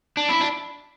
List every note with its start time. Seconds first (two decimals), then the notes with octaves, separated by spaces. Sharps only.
0.17 D4
0.29 E4
0.41 D4